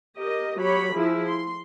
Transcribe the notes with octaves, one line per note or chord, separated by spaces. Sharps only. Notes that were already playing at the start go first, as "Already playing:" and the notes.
G4 A#4 D#5
F#3 G4 C#5 B5
F3 E4 G#4
C6